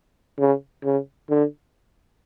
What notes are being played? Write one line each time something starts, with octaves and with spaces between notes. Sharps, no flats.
C#3
C#3
D3